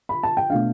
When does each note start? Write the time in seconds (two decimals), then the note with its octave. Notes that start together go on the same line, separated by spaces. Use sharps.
0.09 B5
0.23 A5
0.37 G5
0.50 B2 A3 D4 F5